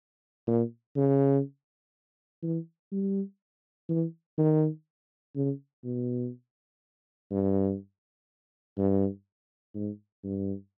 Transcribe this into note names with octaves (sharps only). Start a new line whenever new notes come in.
A#2
C#3
E3
G3
E3
D#3
C#3
B2
G2
G2
G#2
G2